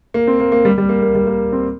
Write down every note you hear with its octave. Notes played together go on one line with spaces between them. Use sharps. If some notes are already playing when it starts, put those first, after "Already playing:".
A#3
C4
A#3
A#3
G3
G3
A#3
A#3
G3
A#3
C4